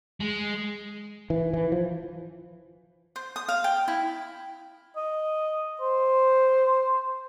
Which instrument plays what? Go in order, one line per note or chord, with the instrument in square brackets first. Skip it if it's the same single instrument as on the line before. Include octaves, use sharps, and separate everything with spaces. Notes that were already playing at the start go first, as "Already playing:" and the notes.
[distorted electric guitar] G#3
[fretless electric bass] E3
E3
F3
[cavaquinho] C5
D#6
F5
G5
E4
[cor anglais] D#5
C5